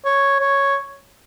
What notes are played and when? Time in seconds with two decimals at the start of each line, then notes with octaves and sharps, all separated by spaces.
0.05 C#5
0.40 C#5